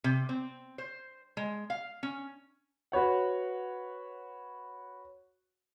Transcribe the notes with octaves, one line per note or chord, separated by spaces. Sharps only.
C3
C4
C5
G#3
F5
C#4
F#4 B4 C#5 F#5